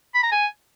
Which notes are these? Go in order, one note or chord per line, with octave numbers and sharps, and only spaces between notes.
B5
A#5
G#5